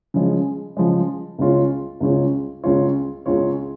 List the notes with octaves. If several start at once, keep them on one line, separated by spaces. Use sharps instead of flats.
C#3 F3 G#3
C#3 F3 G#3
C#2 C#3 G#3 F4 C#5
C#2 C#3 G#3 F4 C#5
C#2 C#3 G#3 F4 C#5
C#2 C#3 G#3 F4 C#5